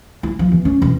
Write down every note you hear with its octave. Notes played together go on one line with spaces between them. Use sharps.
E4
F3
E2
C#4
E1